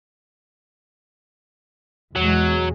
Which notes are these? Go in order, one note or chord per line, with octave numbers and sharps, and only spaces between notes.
E2 B2 F#3 G#3